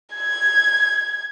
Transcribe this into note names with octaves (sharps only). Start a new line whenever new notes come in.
G#6